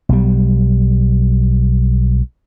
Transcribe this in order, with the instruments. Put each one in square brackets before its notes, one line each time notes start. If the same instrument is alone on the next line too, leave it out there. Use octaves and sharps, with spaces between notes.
[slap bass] B1 G3